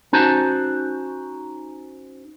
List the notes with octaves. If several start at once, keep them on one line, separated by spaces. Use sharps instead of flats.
C#4 D#4 F#4 C5 A5